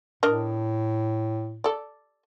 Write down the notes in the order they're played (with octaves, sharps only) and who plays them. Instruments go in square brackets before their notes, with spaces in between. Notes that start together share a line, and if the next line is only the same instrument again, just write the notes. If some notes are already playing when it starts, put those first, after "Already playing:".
[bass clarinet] A2 [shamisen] D4 A#4 D#5
[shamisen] A4 D5